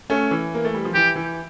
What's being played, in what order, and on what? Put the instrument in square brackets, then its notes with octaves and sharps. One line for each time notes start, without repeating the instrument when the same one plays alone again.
[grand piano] A3 C#4
E3
A#3
A3
G3
F3
[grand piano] E3 [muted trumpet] G4
[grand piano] E3